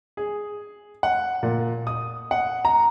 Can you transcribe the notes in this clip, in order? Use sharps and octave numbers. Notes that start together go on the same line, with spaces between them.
G#4
F#5
A#2
D#6
F#5
A#5